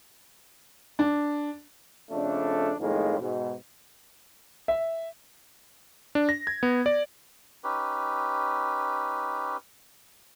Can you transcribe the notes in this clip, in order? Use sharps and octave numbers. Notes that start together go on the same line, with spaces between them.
D4
F2 C#3 A3 D4
F2 A2 D#3 G#3 A#3
G#2 B2
E5
D4
A#6
G#6
B3
D5
C#4 D#4 G4 B4